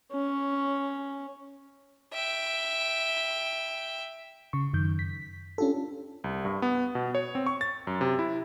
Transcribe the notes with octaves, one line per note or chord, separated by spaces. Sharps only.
C#4
E5 G5
C#3 C#6
F#2 D#3 G6
B6
C#4 D4 F4 G4 A4
C2
G2
B3
B2
C#5
C4
C#6
A6
F#2
C3
E4